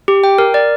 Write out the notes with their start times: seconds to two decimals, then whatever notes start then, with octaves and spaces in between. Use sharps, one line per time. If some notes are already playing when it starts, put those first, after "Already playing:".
0.08 G4
0.24 G5
0.38 A#4
0.54 D5